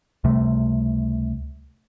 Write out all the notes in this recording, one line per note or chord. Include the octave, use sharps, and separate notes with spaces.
C#2 C3 G3 A3